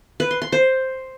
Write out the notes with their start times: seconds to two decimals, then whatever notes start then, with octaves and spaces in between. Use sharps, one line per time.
0.20 B4
0.31 C6
0.42 C6
0.52 C5